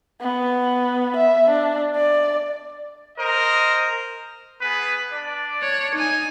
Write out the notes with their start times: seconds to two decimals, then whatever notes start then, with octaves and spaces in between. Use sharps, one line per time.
0.21 B3
1.17 E5
1.50 D4
1.96 D5
3.18 A#4 C5 D#5
4.61 B3 G#4 B4
5.12 D4 D5
5.62 C#5
5.95 D#4 G#5